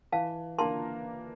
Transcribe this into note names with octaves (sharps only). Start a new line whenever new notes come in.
E3 F5 A5
A#3 D4 F4 A#4 A5 C6